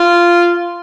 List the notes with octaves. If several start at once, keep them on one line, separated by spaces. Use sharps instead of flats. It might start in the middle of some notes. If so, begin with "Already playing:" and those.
Already playing: F4